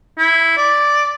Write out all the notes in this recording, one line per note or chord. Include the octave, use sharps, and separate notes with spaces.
E4
D5